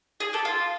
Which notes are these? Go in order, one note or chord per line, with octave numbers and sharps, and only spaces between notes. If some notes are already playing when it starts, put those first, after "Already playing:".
G#4
G4 A4
F4